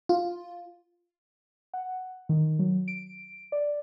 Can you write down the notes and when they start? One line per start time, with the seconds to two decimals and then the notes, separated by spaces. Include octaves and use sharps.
0.09 F4
1.74 F#5
2.29 D#3
2.59 F#3
2.88 D7
3.52 D5